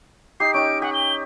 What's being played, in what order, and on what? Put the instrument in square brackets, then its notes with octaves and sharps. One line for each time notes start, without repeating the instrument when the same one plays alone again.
[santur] D#4 G4 [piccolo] C7
[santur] C#4 D#4 G5 [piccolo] D7
[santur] G4 [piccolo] F#5
[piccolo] G7